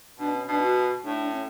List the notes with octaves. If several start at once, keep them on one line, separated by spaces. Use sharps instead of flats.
B2 D4
C#4
B2 D4
F#4
A2 D4
D4
C#4